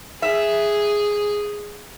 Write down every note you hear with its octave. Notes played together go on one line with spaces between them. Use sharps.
G#4 E5